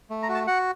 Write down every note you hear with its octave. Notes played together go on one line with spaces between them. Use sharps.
A3
A#5
F#4
A5
F#4 F#5